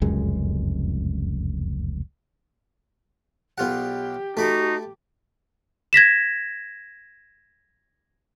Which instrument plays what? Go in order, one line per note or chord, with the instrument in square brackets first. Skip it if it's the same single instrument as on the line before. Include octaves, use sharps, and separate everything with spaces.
[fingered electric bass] F1 C#2 F#2 G#3
[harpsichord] B1 F4 F#5 [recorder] G4
[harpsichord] A3 B5 D6 [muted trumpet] D#4 [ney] F#4
[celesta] G#6 A#6 B6 E7